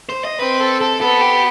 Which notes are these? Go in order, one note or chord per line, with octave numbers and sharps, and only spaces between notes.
C5
D#5
C4 B4
A4
A4
B3 A4
G4